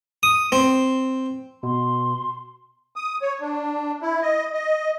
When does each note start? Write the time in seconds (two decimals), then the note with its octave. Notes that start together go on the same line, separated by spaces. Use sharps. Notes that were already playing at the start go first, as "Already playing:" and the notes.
0.23 D#6
0.52 C4
1.63 B2 C6
2.96 D#6
3.22 C#5
3.41 D4
4.02 E4
4.22 D#5
4.53 D#5